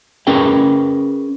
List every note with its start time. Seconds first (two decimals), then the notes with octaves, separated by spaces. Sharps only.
0.27 C#4 G#4 A#4 B4 G5